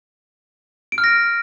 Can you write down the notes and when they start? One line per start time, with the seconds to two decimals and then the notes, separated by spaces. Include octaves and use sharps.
0.92 D7
0.98 F6
1.04 A#6